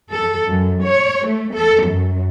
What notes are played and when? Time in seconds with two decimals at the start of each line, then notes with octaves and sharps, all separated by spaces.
0.10 A4
0.49 F#2
0.83 C#5
1.25 A3
1.55 A4
1.85 F#2